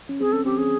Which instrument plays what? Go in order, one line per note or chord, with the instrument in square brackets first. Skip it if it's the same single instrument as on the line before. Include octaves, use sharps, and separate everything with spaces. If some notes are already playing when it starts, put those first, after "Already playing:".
[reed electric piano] C#4
[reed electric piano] C4 [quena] G#4
[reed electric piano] C#4 [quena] A4
[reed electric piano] C4 [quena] G4
[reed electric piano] C#4 [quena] G#4